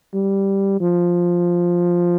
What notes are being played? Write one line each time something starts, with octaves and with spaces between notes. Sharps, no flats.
G3
F3